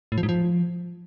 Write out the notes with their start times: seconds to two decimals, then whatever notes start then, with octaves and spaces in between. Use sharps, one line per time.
0.12 A2
0.18 F3
0.23 G#2
0.29 F3